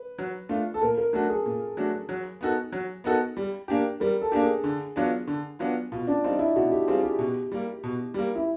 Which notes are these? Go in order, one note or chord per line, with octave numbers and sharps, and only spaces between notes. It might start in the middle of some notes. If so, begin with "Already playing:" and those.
Already playing: B4
F#3
A3 D4 F4
A4
A#2 A#4
A#4
F#3 A3 D4 F#4 A4
G#4
A#2
F#3 A3 D4 F#4
F#3
B3 D#4 F#4 A4
F#3
B3 D#4 F#4 A4
G3
A#3 D4 G4
G3 A#4
A4
A#3 D4 G4
G#4
D3
F#3 B3 D4 F4
D3
F#3 B3 D4 F4
B2 F4
D4
G3 C4 D#4 F4
E4
B2 F#4
G4
G3 C4 F4 G#4
G4
B2
G3 A#3
B2
G3 A#3
E4